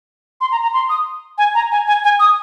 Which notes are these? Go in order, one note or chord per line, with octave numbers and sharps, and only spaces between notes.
C6
A#5
A#5
C6
D#6
G#5
A#5
G#5
G#5
G#5
D#6